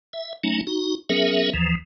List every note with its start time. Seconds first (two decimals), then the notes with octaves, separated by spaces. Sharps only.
0.13 E5
0.44 F#3 A3 C#4 D#4
0.67 D#4 F#4
1.09 F#3 B3 C#4 G#4 A#4 E5
1.54 D#2 E3 F3